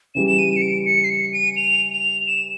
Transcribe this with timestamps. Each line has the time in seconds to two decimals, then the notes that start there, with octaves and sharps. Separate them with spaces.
0.15 C#3 E3 G3 E7
0.27 E7
0.39 D#7
0.56 C#7
0.62 D7
0.86 C#7
1.04 C7
1.10 C#7
1.33 D#7
1.57 F7
1.92 F7
2.27 E7